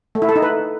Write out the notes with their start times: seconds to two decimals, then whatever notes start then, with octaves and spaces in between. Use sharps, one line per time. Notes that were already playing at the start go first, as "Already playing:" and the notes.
0.15 A3
0.22 E4
0.29 A4
0.36 D#4
0.42 B4